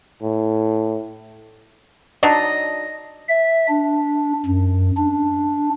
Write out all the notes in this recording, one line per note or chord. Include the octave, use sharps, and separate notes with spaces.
A2
F#3 D4 D#4 D#5
E5
D4
F#2
D4